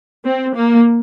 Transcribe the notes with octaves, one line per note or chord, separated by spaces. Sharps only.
C4
A#3